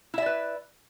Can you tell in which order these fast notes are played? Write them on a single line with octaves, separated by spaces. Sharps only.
E4 E5 D5 B4